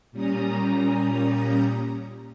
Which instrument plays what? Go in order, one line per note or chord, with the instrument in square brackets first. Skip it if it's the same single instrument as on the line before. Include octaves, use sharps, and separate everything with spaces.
[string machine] A#2 G3 C#4 A#5 D#6